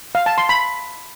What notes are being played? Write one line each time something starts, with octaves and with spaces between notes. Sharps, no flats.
F5
A5
C6
B5